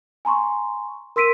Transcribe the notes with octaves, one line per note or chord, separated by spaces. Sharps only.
G#5 A#5 C6 C#6
A#4 C6 E6 B6 D7 D#7